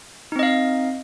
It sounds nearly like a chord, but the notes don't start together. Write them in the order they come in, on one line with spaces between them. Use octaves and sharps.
D#4 C4 D#5 F5